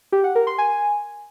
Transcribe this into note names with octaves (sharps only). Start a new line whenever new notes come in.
G4
F#5
A#4
C6
G#5